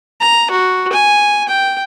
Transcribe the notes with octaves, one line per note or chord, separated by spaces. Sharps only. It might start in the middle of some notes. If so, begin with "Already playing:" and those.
A#5
F#4
G#5
G5